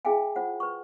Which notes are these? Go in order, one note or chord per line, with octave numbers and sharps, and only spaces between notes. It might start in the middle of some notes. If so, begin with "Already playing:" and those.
E4 G#4 E5 F5 G5 G#5
F4 C5 F#5
B4 C#6